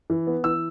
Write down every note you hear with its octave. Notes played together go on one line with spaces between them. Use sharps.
E3
B3
E3 E6